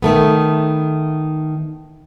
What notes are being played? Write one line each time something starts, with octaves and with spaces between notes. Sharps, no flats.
D#3 A3 B3